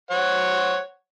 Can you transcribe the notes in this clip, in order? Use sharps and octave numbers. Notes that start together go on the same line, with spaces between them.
C5 C#5 F#5